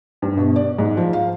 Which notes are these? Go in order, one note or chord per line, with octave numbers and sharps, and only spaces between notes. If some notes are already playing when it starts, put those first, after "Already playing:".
G2
B2
D5
G#2
F3
F5